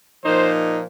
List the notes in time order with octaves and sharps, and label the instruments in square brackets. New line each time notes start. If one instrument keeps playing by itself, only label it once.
[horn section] A#2 F3 A#3 D#4 C5